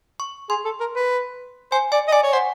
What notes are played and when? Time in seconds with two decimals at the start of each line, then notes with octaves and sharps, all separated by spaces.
0.20 C#6
0.49 G#4 C6
0.65 A4
0.80 A#4
0.95 B4
1.71 C5 G#5
1.92 D5 G#5
2.08 D#5
2.12 D5 G#5
2.23 C#5
2.33 C5 F#5